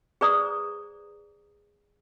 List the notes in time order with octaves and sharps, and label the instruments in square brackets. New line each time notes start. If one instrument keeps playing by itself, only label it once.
[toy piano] G#4 B4 C5 D5 A#5 D#6